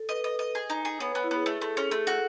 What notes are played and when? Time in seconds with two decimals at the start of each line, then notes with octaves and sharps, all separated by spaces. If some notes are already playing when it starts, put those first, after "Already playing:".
Already playing: A4
0.09 B4 D#5
0.24 D#5
0.39 D#5
0.55 G#4
0.70 D#4
0.85 G#4
1.00 B3 C#5
1.12 B4
1.15 B3
1.24 E4
1.31 B3 G#4
1.46 A3
1.61 A3 A4
1.76 C#4 G#4
1.91 A3 A4
2.07 F#4